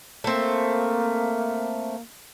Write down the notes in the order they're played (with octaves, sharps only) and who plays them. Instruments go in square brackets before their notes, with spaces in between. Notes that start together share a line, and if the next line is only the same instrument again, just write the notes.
[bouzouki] A3 C4 [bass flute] A#3